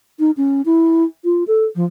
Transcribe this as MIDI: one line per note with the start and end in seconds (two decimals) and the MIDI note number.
0.19 0.31 63
0.37 0.62 61
0.65 1.04 64
1.24 1.44 65
1.47 1.65 69
1.75 1.85 53